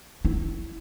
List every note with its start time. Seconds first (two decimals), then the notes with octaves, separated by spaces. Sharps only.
0.25 E4